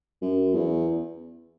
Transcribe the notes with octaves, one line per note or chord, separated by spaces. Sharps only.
F#2
E2